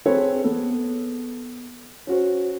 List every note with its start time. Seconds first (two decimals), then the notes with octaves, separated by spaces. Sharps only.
0.06 C4 G#4 A4 B4 C#5
0.44 B3 A4
2.07 C#4 F#4 C5